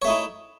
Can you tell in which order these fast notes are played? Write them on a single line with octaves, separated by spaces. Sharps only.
C#5 A3 D#4 E4